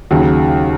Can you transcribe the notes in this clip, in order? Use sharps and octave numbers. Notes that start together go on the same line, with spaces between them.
D#2 C#3 F#3